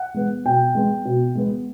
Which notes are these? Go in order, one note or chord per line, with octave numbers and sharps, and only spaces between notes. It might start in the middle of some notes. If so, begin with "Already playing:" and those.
Already playing: F#5
G#3 B3
B2 G5
G#3 B3
B2
G#3 B3